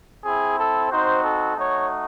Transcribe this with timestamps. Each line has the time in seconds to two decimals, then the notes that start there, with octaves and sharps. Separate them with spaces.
0.23 C4 E4 G#4
0.57 A4
0.91 C4 D#4 F#4 C5
1.23 A4
1.57 A3 D#4 F#4 C#5